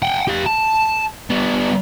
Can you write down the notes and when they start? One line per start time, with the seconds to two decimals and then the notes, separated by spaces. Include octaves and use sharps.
0.02 F#5 G5
0.27 G4 F5
0.46 A5
1.30 G3 B3